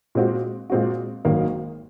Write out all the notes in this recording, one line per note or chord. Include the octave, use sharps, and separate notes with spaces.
A#2 G#3 C4 F#4
A#2 G#3 C4 F#4
G#1 G#2 D#3 F#3 A#3